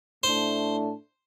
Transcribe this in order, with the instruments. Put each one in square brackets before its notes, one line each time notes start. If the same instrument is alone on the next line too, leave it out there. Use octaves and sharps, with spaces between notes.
[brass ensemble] A2 A3 D4 [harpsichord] C5